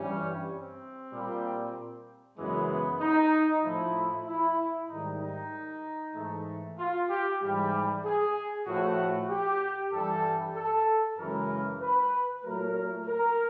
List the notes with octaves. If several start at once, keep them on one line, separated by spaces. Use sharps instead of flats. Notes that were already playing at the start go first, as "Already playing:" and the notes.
Already playing: G2 E3 G3 C#4
C4
A#2 G3
F#2 C#3 E3 G#3 B3
B3
D#4
A2 F3 A3 E4
E4
G#2 D#3 G3 D#4
D#4
G#2 E3 A3
F4
G4
G#2 E3 G3
G#4
A2 F3 A3 F#4
G4
G2 E3 G3 A4
A4
F#2 C#3 E3 G#3 A#4
B4
A#2 F#3 A3 A#4
A#4